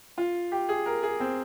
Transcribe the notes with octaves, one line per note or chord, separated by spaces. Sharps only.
F4
G4
G#4
A#4
G#4
C4